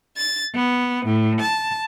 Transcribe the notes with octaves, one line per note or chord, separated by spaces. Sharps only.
A6
B3
A2
A5